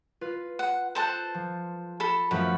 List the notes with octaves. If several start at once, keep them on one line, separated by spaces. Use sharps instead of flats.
F4 B4
F#5
A4 C5 A5 F#6 G6
F3
A4 A5 B5
F#2 F3 A3 B4